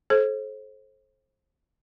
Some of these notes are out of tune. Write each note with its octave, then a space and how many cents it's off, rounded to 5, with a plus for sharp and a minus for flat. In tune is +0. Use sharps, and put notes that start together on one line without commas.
A4 -35 C5 +30